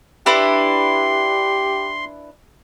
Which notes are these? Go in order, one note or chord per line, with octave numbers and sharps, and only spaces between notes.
D4 E4 G4 B4 C6